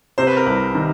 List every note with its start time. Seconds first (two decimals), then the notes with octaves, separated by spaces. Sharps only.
0.18 C3 C5
0.27 B4
0.37 A#4
0.46 C2 B4
0.75 D#3